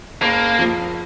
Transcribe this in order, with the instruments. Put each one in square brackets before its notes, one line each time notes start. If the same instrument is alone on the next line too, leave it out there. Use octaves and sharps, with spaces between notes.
[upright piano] F#1 [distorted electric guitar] A#3
[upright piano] F3